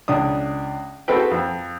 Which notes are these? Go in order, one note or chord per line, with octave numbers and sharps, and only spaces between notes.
C#2 D4 D#6
C4 F#4 G#4 A4 B4 G5
F2